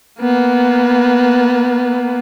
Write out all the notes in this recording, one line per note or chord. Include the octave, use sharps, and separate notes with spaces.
A#3 B3